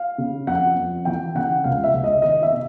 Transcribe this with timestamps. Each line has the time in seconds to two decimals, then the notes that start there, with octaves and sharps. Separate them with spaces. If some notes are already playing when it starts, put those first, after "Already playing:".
Already playing: F5
0.18 C#3
0.47 F2 F#5
0.76 F2
1.05 E3 G5
1.35 C#3 F#5
1.64 C#2 F5
1.84 E5
1.94 C#2
2.04 D#5
2.22 D#3 D#5
2.43 E5
2.52 C3